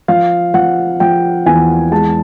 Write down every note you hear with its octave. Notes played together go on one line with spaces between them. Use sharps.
F3 F5
F3 F#5
F3 G5
E2 G#5
G#3 A5